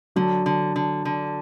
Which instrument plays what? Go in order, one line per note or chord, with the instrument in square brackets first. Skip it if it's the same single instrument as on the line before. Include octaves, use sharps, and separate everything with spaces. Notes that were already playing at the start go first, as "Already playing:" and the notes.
[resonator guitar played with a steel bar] D3 [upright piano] F#3
[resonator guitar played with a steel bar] D3
D3
D3